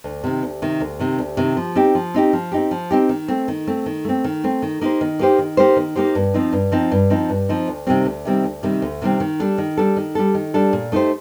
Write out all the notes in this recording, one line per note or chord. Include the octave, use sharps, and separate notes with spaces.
D2
C3 D#3
D2
C3 D#3
D2
C3 D#3
D2
C3 D#3
F3
C4 D#4 G4
F3
C4 D#4 G4
F3
C4 D#4 G4
F3
C4 D#4 G4
D#3
A3 C4
D#3
A3 C4
D#3
A3 C4
D#3
A3 C4
D#3
A#3 D#4 G4 C5
D#3
A#3 D#4 G4 C5
D#3
A#3 D#4 G4 C5
D#3
A#3 D#4 G4 C5
G2
F3 C4 D#4
G2
F3 C4 D#4
G2
F3 C4 D#4
G2
F3 C4 D#4
D2
C3 D#3 G3 C4
D2
C3 D#3 G3 C4
D2
C3 D#3 G3 C4
D2
C3 D#3 G3 C4
D#3
G3 D4 A4
D#3
G3 D4 A4
D#3
G3 D4 A4
D#3
G3 D4 A4
A#2
A3 D#4 G4 C5